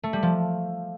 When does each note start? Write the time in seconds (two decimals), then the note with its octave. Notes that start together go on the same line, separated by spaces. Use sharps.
0.03 A3
0.13 G3
0.22 F3